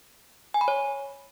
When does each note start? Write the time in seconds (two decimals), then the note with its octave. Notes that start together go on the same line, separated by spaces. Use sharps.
0.54 G#5
0.61 B5
0.68 C#5